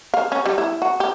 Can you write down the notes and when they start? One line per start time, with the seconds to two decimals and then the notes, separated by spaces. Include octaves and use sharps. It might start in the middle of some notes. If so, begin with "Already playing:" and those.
0.14 F5
0.32 C#4
0.46 G3
0.58 E4
0.82 F#4
1.00 G4